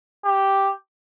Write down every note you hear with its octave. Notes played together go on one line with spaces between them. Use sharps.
G4